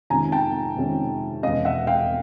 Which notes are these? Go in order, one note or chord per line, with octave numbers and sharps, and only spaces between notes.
F2 C3 D#3 G#3 C#4 G#5 A#5
G5 A5
F2 C3 D#3 G#3 C#4
E2 B2 G#3 C#4 D#5 F5
E5 F#5
F5 G5